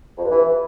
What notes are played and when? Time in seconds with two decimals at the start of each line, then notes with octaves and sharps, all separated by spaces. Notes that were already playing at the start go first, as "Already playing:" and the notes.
0.18 F2
0.24 G2
0.31 E3